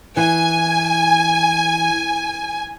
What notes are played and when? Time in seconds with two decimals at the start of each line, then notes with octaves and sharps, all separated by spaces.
0.17 E3 G#5